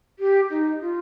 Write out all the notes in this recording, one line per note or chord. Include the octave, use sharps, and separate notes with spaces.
G4
D#4
F4